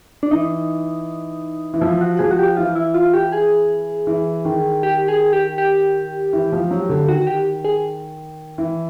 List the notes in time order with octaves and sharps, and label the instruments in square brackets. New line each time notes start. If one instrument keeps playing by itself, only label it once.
[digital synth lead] D4
[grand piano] E3 [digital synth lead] D#4
[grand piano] E3
[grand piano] F3 [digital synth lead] E4
[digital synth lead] F#4
[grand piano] F3 [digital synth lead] G#4
[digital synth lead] F#4
G4
[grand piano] E3 [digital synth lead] F4
[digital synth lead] E4
F4
G4
G#4
[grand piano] E3
D#3
[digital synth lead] G4
G#4
G4
G4
[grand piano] E3
F3
F#3
D3
[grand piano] D#3 [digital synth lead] F#4
[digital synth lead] G4
G#4
[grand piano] E3